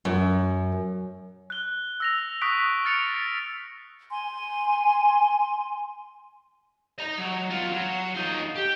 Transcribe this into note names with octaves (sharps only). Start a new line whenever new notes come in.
F#2
F#6 G7
E6 A#6 F7
C#6 D#6 F#6 B6 D7
F6 A6 C#7 D7 F7
A6
G#5 C6
D#5 A#5
F#3
B3 F4
F#3
D#4 F4
G4